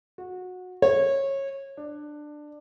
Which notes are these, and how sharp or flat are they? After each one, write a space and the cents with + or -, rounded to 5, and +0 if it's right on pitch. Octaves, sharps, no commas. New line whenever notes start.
F#4 -20
C#5 -20
D4 +15